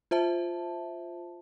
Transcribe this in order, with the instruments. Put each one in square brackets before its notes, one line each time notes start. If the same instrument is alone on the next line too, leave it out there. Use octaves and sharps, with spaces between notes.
[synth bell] F4 C5 E5 A5